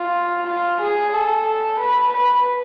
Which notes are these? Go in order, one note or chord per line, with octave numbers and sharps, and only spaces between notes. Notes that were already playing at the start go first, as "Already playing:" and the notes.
Already playing: F4
F4
G#4
A4
B4
B4